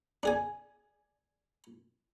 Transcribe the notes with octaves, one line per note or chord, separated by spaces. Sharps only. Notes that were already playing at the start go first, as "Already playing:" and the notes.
D4 G#4 G#5